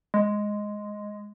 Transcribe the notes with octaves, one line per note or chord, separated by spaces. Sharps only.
G#3